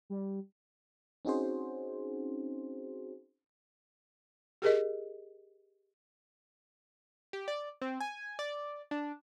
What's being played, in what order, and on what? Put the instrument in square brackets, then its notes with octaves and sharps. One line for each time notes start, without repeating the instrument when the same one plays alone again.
[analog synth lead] G3
[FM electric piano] C4 C#4 D#4 F#4 G#4 C5
[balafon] G4 G#4 A#4 D#5
[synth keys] G4
D5
C4
G#5
D5
D4